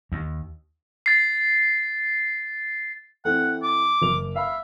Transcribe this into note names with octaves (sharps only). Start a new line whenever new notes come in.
D#2
A6 C7
E3 A3 C4 F#5
D6
F#1 A#4 F7
E5 F5 B5